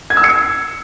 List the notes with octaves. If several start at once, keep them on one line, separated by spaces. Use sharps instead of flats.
G#6
E6
C#7